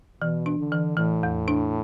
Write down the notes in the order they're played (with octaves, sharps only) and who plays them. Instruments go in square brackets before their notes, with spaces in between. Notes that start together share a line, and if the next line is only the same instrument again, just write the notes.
[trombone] B2 [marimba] E3
[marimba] D4
[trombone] D3
[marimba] E3
[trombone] A2 [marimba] E3
[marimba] E2
D4